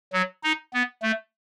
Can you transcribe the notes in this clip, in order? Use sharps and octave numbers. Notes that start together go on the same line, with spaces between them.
F#3
D#4
B3
A3